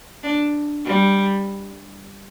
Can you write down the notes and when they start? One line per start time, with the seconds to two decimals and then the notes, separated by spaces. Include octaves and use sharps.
0.23 D4
0.86 G3